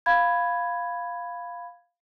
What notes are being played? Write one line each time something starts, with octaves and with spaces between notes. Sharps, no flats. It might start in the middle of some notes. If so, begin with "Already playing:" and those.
F5 B5 G#6